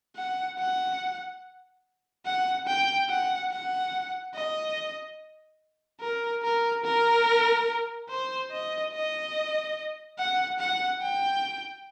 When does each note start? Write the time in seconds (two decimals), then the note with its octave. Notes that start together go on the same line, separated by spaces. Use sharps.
0.17 F#5
0.59 F#5
2.26 F#5
2.67 G5
3.09 F#5
3.51 F#5
4.34 D#5
6.01 A#4
6.43 A#4
6.84 A#4
8.09 C5
8.51 D#5
8.93 D#5
10.18 F#5
10.59 F#5
11.02 G5